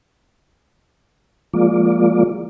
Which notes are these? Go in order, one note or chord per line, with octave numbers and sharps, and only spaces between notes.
F3 G#3 A#3 F4 D5